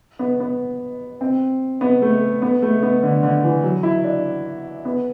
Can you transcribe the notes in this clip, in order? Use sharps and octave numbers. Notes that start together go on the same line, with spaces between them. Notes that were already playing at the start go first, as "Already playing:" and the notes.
B3
B3
C4
B3
A3
B3
A3
B3
D3
D3
E3
F#3
E4
D4
B3